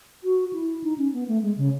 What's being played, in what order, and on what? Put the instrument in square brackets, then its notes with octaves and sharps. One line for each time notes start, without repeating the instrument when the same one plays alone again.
[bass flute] F#4
E4
D#4
C#4
B3
A3
G#3
C#3